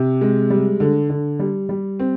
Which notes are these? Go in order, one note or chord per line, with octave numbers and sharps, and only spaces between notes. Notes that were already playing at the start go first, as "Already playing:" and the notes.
Already playing: C3
G#3
G3
D3
D3
G3
G3
C4